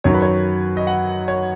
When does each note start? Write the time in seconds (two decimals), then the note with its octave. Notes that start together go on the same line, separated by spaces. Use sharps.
0.04 F#2 D#3 F#3 C#5
0.14 B4
0.22 C#5
0.77 D#5
0.87 F#5
1.28 C#5